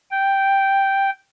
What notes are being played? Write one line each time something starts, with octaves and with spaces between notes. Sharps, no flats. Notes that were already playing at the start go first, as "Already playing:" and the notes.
G5